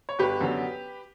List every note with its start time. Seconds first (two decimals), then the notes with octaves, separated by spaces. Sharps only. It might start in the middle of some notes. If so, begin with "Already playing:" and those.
0.09 C#5
0.19 G1 G4 B4
0.41 F#2 D3 F#3 B3